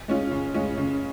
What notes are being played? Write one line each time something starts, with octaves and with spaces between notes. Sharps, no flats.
G#3 C#4 F4
C#3
G#3 C#4 F4
C#3